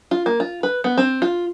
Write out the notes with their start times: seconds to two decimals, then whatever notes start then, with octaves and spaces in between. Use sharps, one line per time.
0.11 F4
0.26 A#3
0.40 F4
0.63 B4
0.84 B3
0.97 C4
1.22 F4